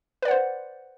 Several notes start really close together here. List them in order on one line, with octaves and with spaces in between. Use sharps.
B4 D5 F#5 C5